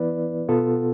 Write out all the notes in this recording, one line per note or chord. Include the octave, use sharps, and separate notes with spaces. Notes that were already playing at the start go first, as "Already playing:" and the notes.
Already playing: E3 B3 E4 B4 D5
B2 B3 F4 A4